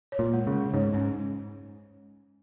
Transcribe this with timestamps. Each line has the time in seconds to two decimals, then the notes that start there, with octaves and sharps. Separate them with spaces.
0.12 C#5
0.19 A#2
0.33 G#3
0.47 C#3
0.53 G#3
0.73 G#2 C#5
0.93 G#2 C#4